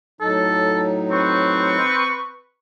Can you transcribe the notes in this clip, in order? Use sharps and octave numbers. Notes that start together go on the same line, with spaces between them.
A2 F#3 D#4 A4
C4 B4 C#6